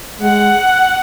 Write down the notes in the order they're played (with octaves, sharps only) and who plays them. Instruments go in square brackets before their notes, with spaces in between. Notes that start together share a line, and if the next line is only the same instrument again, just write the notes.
[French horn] G#3 [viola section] F#5